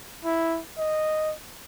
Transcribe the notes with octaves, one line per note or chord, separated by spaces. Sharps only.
E4
D#5